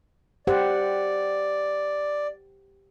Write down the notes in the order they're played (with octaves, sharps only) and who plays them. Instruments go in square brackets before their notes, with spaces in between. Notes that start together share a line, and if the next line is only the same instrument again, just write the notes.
[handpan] G4 C5 F#5 [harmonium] D5